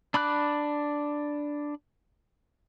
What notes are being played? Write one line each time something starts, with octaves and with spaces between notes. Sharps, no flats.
D4 B5 D6 F#6